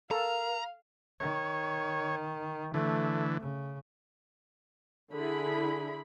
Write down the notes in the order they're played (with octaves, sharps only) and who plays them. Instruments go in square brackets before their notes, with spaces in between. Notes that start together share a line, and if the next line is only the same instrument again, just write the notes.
[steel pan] A4 [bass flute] A#4 [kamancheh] F5 [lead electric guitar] A#5
[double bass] D#3 [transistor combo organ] C#5
[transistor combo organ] D3 E3 [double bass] A3
[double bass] C#3
[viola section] D3 E4 G#4 B5